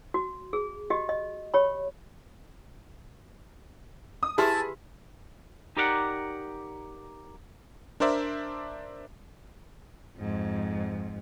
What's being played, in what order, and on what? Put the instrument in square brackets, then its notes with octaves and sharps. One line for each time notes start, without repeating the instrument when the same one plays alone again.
[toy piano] F#4
G#4
F#4 G4 D#5
D#5
G4 C#5 B5
[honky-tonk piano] D#6
[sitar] E4 [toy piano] G4 B4 C6 [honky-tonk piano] G#4 [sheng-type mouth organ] A5
[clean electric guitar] D#4 G4 A#4 D5 F5 F#5
[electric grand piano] D4 A#4 C5 D5 E5
[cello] F2 G#2